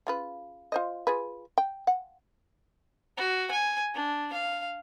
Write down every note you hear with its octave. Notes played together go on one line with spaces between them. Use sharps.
C#3 F4 B4
F4 C5 D#5
F4 G#4 B4
G5
F#5
F#4
G#5
D4
F5